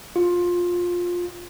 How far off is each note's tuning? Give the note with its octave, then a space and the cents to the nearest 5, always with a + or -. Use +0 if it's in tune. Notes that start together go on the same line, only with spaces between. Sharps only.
F4 +15